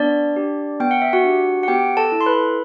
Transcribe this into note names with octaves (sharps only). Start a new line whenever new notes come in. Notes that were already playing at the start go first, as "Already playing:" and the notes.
Already playing: B3 D4 D5
D4 G4
B3 G5
F#5
E5
F#4 F#5
D4 G4
F#5
B3 G4 G5
A4 A5
E4 A4
C6
B4 B5